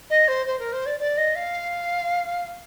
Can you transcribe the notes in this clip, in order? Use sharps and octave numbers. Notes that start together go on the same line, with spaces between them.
D#5
C5
C5
A#4
C5
D5
D5
D#5
F5